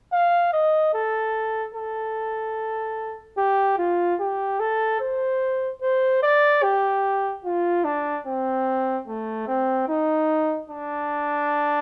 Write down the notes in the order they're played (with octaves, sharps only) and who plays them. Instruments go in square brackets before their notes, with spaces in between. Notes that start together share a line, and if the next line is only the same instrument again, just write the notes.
[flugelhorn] F5
D#5
A4
A4
G4
F4
G4
A4
C5
C5
D5
G4
F4
D4
C4
A3
C4
D#4
D4